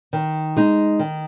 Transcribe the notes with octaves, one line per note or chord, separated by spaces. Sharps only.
D#3
G#3 D#4
D#3